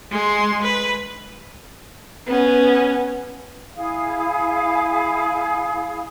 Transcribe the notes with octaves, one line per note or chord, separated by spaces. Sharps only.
G#3 C6
B4
B3 C#4
E4 G#4 F5